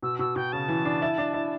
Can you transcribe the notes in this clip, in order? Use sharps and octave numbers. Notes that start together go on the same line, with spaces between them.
B2 E6
B2 E6
B2 G5
C#3 A5
E3
D4
E4
D4
E4